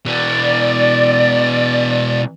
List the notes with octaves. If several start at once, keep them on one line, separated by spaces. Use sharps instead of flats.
B2 E3 D5